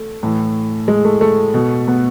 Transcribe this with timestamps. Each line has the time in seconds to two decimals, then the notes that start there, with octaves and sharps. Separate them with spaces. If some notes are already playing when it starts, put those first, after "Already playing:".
Already playing: A3
0.23 A2 E3
0.88 G#3
1.05 A3
1.21 A3
1.54 B2
1.88 B3